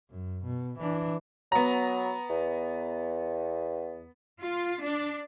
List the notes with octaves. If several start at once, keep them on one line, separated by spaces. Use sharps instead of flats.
F#2
B2
E3 D4
F#3 B3 A#5
E2
F4
D4